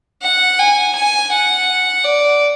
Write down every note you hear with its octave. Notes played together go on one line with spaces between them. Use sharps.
F#5
G#5
G#5
F#5
D5